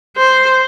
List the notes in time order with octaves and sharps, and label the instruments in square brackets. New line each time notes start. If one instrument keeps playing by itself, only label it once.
[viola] C5